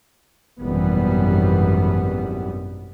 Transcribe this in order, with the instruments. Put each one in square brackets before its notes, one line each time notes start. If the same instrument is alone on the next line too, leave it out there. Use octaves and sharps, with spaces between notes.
[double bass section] G#1 F#2 B2 E3 G3 B3